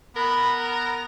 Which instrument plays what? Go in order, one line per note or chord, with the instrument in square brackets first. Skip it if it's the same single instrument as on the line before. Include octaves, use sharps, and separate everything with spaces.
[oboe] B3 [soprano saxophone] A#4 [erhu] B5
[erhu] A#5